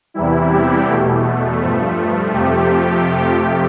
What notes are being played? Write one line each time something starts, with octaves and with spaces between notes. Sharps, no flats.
E2 C3 E3 G3 E4
G4
E2 B2 A3
G2 F3 A3
F2 C3 F3 A3 G4